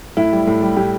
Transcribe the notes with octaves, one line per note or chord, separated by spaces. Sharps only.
A2 E4
G3
A2
G3
A2 G4